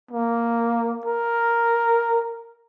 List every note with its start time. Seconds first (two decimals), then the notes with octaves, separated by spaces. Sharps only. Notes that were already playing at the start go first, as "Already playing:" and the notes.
0.11 A#3
1.06 A#4